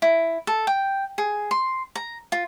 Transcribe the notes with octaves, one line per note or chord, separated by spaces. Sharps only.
E4
A4
G5
G#4
C6
A#5
F4